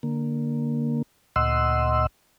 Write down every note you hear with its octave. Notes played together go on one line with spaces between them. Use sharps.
D3 A#3
D2 A#2 D#5 F#5 C6 E6